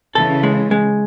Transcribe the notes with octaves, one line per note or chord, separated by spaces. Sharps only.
C#3 E3 A4
G#3
G#3